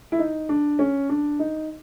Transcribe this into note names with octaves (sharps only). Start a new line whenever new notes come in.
E4
D#4
D4
C#4
D4
D#4